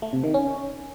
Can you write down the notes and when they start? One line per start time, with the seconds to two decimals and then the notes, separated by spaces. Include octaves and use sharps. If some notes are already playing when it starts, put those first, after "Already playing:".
0.02 A3
0.13 C3
0.24 D#3
0.34 C#4